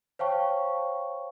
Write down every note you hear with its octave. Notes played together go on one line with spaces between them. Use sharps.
C5 C#5 F5 G5 A5 C#6